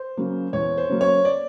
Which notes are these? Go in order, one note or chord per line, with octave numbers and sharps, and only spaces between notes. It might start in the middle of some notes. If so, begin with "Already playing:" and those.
Already playing: C5
C#3 F#3 A#3
E2 C#5
C5
C#3 F#3 A#3
C#5
D5